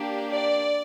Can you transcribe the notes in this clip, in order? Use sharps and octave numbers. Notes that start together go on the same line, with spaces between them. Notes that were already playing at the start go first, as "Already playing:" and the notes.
Already playing: A#3 D4 G4
D5